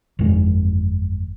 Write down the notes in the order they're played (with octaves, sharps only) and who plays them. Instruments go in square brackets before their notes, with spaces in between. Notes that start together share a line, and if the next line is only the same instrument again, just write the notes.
[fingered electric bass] G1 F2 D#3 G#3